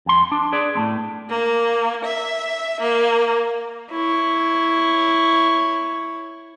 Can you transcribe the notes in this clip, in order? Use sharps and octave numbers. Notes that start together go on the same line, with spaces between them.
F2 C6
D4
G#4 B4 D5
A2 A3 C4
A#3
E5
A#3
E4 C#5